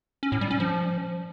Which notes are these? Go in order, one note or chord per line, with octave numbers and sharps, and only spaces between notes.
C#4
A2
G3
C#4
F3